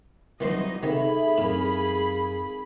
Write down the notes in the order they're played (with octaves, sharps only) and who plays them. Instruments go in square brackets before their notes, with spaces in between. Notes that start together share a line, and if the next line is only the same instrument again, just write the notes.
[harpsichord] D#3 E3 C5 [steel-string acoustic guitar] F#3 G3 C4 [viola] D#4 D#5
[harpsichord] C3 D#3 [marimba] D#4 A4 [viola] G#4 B5 [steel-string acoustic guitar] E5
[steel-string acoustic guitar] F#2 F5 [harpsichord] A2 [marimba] C4 A#4